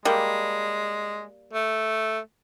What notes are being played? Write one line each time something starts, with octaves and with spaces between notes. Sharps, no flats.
G3 G#3 A#3
A3